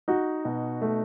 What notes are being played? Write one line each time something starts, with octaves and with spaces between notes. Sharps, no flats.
D#4 F#4
B2
A3